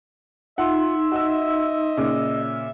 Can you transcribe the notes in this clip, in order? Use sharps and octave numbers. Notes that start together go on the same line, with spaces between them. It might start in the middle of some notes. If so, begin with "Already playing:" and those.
D#4 F4 E5 F#5 C6
F#4 D#5 E6
A#2 C#3 D6